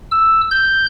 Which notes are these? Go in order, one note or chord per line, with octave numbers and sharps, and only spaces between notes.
E6
G6